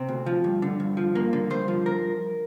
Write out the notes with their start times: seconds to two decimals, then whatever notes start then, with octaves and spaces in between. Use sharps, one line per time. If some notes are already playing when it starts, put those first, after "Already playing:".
Already playing: C3 C4
0.09 D2
0.26 F3
0.44 G2
0.62 D3
0.80 G2
0.97 F3
1.15 G2 A#3
1.33 D3
1.50 G2 C5
1.68 F3
1.86 A#4